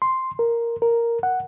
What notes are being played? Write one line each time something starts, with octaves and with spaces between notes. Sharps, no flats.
C6
A#4
A#4
F#5